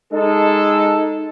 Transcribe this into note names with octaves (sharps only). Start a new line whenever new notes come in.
G#3 D#4 A4